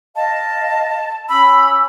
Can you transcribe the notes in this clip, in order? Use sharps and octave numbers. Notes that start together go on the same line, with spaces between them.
D#5 F5 A5
C#4 B5 E6